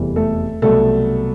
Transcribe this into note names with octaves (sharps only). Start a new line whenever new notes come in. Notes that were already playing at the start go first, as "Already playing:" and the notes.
Already playing: F1 E2 C3 E3 G3
A3 A4
C2 B2 F#3 A3 A4